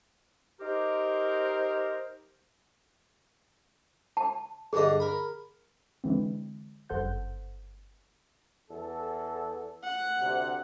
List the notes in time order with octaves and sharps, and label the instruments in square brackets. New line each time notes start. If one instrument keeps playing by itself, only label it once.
[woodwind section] D#4 G4 A#4 C5
[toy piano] A5
[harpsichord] G2 D3 D#5 [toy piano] G#4
[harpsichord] A#4 B5
[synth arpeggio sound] D3 E3 G#3 C4
G1 F#2 A4 C5 F#5 G6
[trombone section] E2 A4
[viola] F#5
[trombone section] D2 C3